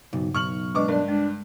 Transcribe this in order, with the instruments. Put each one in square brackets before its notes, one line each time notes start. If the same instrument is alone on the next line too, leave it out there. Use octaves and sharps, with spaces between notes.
[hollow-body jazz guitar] B1 [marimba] G2 C#3 D#4
[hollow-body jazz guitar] B1 [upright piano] C#6 F6 F#7
[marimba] G#3 B4 D#5 [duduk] D4 [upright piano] C#6 D6
[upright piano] G2 [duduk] D4 [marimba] A#4 D5
[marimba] G#3 [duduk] D4